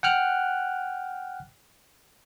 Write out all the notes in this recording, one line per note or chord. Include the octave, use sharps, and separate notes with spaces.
F#5 G5 F6 F#6